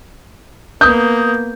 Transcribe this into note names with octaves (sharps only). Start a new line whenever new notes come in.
A#3 B3 D#6 G6